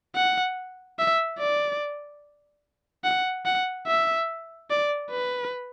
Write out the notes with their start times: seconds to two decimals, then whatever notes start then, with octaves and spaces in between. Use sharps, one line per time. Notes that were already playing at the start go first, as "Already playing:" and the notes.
0.15 F#5
0.99 E5
1.39 D5
3.04 F#5
3.46 F#5
3.87 E5
4.70 D5
5.11 B4